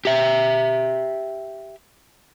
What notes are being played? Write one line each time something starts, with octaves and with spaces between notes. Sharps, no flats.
G4 E5